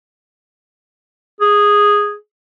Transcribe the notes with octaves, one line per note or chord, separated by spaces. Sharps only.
G#4